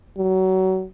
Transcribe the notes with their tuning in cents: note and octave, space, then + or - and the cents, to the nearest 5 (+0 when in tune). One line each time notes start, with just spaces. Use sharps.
F#3 +25